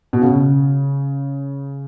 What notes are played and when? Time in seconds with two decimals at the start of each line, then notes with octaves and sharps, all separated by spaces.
0.13 B2
0.22 C#3